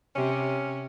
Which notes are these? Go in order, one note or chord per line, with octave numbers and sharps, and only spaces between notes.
C3 C#4